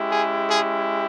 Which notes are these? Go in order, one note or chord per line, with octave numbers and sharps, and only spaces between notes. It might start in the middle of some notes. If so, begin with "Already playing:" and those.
Already playing: G#3 C#4 E4 G4
G#4
G#4